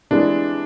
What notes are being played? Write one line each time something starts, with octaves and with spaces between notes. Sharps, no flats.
C3 E3 G#3 D4